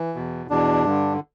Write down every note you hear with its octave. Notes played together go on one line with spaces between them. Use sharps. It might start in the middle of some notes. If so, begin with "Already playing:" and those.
Already playing: E3
E2 B2
E2 B2 D4
G2 D3